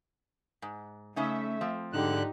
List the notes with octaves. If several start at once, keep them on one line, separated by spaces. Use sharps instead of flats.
G#2
C#3 A3 C#4 D#4 E5
F3 C4
G#2 D3 D4 D#4 G4 F#6